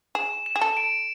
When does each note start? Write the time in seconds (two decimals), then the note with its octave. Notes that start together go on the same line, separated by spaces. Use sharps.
0.15 G#4 E7
0.46 E7
0.56 G#4
0.61 A4
0.77 D7